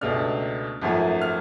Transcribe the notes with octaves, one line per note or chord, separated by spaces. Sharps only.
C#2 B2 A3 D4 F6
G#1 F#2 F3 A3
F6